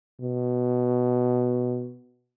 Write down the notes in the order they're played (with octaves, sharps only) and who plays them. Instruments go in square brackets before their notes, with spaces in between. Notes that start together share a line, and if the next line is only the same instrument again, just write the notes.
[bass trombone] B2